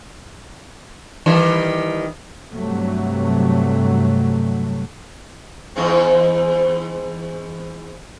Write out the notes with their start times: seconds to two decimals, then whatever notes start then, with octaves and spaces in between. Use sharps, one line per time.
1.26 D#3 E3 G3
2.52 G2 C3 F#3 A3
5.76 E2 G#2 C4